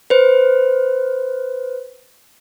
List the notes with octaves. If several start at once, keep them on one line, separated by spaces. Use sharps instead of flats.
B4 C5